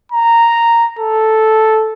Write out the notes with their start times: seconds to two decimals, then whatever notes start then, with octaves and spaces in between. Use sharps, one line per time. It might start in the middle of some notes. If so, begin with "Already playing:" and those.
0.12 A#5
0.99 A4